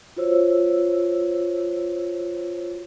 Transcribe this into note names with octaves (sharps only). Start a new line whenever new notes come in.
F4 F#4 C5 C#5 E6